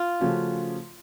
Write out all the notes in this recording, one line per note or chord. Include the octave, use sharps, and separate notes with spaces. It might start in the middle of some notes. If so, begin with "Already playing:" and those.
Already playing: F4
C#3 F3 A3 C#4 F#4